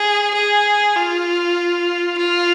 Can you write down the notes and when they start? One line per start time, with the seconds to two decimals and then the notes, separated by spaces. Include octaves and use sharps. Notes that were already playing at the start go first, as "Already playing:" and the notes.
Already playing: G#4
0.35 G#4
0.96 F4
2.18 F4